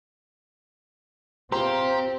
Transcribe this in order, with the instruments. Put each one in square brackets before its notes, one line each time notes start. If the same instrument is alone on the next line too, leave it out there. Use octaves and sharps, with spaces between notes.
[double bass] C4 [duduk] F4 [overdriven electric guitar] G4 [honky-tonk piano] C5 A#5 C6